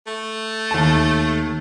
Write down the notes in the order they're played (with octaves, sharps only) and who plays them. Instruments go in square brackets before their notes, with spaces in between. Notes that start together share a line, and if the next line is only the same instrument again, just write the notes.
[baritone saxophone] A3
[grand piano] D#2 A5